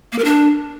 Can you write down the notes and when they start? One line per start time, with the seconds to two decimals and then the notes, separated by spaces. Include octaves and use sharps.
0.12 A#3
0.18 A#4
0.25 D4